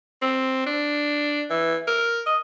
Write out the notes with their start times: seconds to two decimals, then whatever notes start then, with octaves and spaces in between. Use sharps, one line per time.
0.22 C4
0.66 D4
1.50 E3
1.88 A#4
2.26 D#5